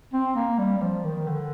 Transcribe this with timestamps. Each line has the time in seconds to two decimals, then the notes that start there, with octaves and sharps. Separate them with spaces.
0.13 C4
0.36 A#3
0.58 G3
0.77 G3
0.82 F3
1.05 D#3
1.27 D3